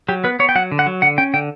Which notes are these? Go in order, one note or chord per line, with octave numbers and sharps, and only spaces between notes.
F#3 G4
B3 B4
B3 C#5
G5
F#3 F#5
D3
F#5
F#3
D3 F#5
C#4 G5
D3 G5